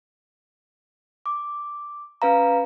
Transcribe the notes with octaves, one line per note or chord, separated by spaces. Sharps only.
D6
C#4 B4 F5 A#5